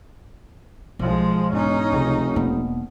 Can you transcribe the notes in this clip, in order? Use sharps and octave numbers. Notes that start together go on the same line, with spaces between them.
B1 F3 G#3
E1 G#2 C#4 D#4
F1 C#2 C3
E1 B2 A#3